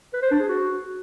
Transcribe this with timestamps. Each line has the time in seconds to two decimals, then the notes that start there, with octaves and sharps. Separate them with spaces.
0.13 B4
0.22 C5
0.31 D4
0.40 G#4
0.49 F#4